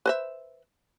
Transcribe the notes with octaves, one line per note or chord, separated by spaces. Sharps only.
B4 C5 E5